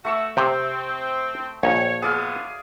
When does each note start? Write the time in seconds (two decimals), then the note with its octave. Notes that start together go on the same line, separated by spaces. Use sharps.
0.05 A3 B3 F#4 C#6 E6
0.37 C3 C4 G5
1.63 A#1 C#5
2.02 G#2 F#3 B3 G#4 D5 F5